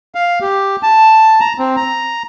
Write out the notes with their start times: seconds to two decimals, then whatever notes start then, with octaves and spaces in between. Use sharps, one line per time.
0.15 F5
0.41 G4
0.83 A5
1.40 A#5
1.59 C4
1.76 A#5